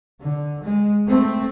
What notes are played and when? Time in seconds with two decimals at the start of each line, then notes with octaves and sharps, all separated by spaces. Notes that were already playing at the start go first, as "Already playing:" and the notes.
0.20 D3
0.63 G#3
1.08 A3 C4